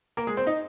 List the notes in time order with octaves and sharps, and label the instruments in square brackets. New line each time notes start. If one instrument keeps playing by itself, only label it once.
[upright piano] A#3 A#4
G#3 G#4
C4 C5
D#4 D#5